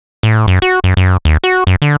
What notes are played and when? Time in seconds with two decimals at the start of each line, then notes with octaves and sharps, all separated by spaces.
0.23 A2
0.48 F#2
0.62 F#4
0.84 F#2
0.97 F#2
1.25 D#2
1.44 F#4
1.67 F#2
1.82 D3